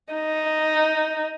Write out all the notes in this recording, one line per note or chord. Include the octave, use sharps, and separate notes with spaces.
D#4